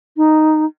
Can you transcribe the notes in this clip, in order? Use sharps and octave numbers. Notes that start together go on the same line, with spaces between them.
D#4